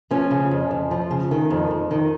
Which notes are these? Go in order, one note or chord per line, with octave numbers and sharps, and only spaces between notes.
F3 C#4
C#3
F2
F2
F3
C#3
D#3
F2
F2
D#3